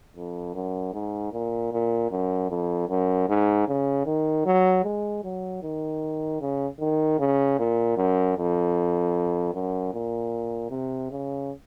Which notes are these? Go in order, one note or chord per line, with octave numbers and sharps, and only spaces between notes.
F2
F#2
G#2
A#2
A#2
F#2
F2
F#2
G#2
C#3
D#3
F#3
G#3
F#3
D#3
C#3
D#3
C#3
A#2
F#2
F2
F#2
A#2
C3
C#3